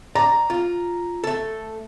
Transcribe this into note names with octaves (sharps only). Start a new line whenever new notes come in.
D5 A#5
F4
A3 A4